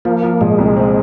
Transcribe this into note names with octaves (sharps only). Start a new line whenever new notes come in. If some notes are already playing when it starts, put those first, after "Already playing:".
F3 A#3
F3
A#2 G#3
C2
C4